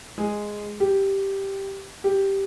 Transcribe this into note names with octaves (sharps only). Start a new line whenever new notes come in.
G#3 G#4
G4
G4